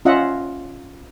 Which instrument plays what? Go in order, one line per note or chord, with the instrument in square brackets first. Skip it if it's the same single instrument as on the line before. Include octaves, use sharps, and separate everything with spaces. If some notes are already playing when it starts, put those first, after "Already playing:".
[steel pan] C#4 F4 D#5 E5 F#5